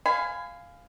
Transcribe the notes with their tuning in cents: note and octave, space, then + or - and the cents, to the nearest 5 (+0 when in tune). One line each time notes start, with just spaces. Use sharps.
F5 +0 G#5 +0 B5 +35